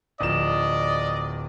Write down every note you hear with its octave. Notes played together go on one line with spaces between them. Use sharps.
D1 F3 D5 D#5 E7